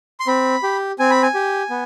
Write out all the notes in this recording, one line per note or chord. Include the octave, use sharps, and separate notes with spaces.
C6
C4 B5
G4
C4 G#5
B5
G#5
G4
B3